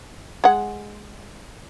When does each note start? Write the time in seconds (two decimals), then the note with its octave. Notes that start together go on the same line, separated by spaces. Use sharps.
0.44 G#3 F#5